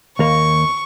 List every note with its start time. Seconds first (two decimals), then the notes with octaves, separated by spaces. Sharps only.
0.19 D#2 A#3 C#6